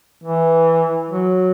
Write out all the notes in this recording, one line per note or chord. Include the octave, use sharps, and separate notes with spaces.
E3
F#3